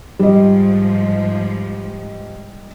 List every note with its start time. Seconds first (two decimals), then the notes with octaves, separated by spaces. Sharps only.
0.19 G#2 F3 G3 D#5